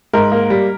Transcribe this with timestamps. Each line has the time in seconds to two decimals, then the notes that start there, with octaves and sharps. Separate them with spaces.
0.14 G#2 A#4
0.32 A#3
0.50 G3